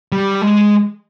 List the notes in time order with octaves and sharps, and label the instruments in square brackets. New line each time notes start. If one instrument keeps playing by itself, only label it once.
[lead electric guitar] G3
G#3